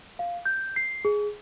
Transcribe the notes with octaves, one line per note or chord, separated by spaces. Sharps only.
F5
G6
C7
G#4